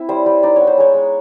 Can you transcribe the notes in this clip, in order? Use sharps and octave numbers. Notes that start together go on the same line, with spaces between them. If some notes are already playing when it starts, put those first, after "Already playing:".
Already playing: C4 E4
G3 C5
G3
D#4 D5
B3 C#5
C5
G#3 C#5
G#3